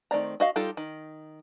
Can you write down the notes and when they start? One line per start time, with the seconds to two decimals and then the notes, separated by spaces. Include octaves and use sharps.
0.11 D#3 A3 C4 D5 A#5
0.40 F#4 D#5 F5
0.56 G3 D#4 F4 G4 A4
0.77 D#3